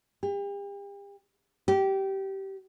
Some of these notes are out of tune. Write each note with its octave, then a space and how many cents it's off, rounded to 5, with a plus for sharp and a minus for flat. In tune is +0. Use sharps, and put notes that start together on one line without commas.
G4 +40
G4 -20